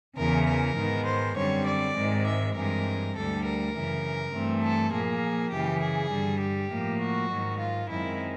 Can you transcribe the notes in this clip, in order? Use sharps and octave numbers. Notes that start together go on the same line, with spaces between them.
E2 C#3 E3 A#4
A#4
G#2 D#3 G#3 B3
C5
F#2 D3 G3 C4 C#5
D5
G#2 D#3 G#3 C4
E5
G2 E3 G#3 C4 A#4
D2 D3 G3 A4
A#4
F#2 C#3 E3
G2 E3 A3 C4
A4
A#2 F3 A#3 G#4
F#2 C#3 E3 G4
G#4
G2 D3 G3
G4
A2 F3 A#3
F#4
G#2 D#3 F#3
F4
F#2 D#3 G#3 C4 E4